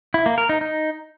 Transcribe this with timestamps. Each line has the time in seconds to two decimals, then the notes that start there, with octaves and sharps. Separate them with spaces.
0.14 E4
0.26 A#3
0.38 A#4
0.49 D#4
0.61 D#4